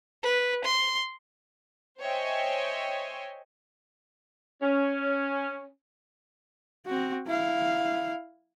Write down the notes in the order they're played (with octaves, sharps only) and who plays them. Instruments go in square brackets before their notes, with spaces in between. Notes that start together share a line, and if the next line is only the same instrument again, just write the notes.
[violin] B4
C6
[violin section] C5 C#5 D#5 E5 G5 G#5
[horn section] C#4
[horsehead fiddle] C4 F#4
E4 F5